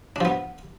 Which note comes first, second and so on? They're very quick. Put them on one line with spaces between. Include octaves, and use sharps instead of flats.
D4 F3 B3